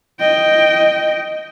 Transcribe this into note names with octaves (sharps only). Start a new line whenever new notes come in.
D#5 G5